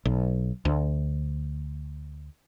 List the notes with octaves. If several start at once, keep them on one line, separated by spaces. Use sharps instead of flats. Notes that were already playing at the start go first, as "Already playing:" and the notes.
B1
D2